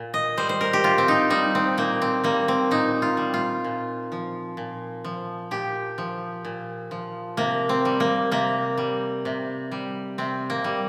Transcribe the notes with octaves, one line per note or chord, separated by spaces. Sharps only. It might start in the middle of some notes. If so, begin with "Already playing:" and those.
Already playing: A#2
D#5
G3 C5
C5
A#4
G4
A#2 F4
C4
D#4
G3 D#4
C4
A#2 A#3
C4
G3 A#3
C4
A#2 D#4
F4
G3
F4
A#2
F3
A#2
F3
A#2 G4
F3
A#2
F3
C3 A#3
C4
G3
A#3
C3 A#3
G3
C3
G3
C3 C4
A#3
G3